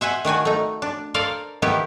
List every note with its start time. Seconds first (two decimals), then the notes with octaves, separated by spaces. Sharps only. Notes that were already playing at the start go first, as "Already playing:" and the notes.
0.01 C5 E5 F#5 G#5
0.25 D#3 D4 F#4 G#5
0.45 A3 D#4
0.82 D4
1.14 A4 A#4 C5 D5 F5
1.62 D#3 B3 E4 G4